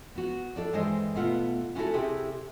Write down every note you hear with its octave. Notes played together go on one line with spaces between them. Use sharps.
B3 F#4
D4 E4 A4 D5
G2 E3 G#3 C5 D#5
B2 A3 B3 F4 F#5
B3 C#4 D4 E4 F#4 A4
C3 E4 G4 G#4